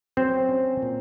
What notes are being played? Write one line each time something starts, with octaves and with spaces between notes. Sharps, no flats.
F#3 C4 C5
C#4
A#2